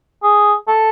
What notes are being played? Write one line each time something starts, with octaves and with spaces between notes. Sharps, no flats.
G#4
A4